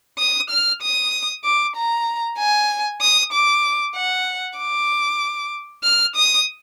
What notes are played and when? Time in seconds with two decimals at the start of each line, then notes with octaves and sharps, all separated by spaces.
0.18 D#6
0.50 F6
0.82 D#6
1.44 D6
1.76 A#5
2.38 G#5
3.01 D#6
3.32 D6
3.95 F#5
4.58 D6
5.83 F6
6.16 D#6